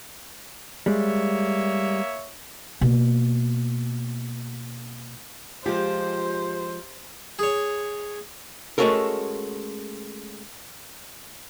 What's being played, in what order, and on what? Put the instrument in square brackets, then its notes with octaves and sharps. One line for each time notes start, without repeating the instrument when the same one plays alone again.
[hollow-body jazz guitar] G3 G#3 [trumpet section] A#3 C#5 E5
[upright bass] B2 A#3
[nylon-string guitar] F3 G#3 F4 [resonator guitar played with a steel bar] G4 [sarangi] C5
[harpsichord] G#4 C#5
[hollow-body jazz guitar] G#3 A3 C#4 F#4 A4 A#4